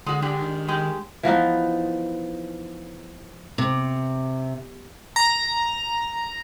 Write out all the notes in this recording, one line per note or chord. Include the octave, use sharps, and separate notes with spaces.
D3 G#3 F#4
G#3 D4 G4
D#3
G#3 G4
E3 F3 B3 D#4
C3
A#5